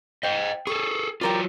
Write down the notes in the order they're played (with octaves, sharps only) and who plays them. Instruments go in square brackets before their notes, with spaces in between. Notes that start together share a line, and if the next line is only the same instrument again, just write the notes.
[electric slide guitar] C5 D#5 [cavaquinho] G5
[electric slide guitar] G#4 A4 [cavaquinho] C#6
[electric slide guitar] F#3 F4 [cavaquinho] G4 A#4 D5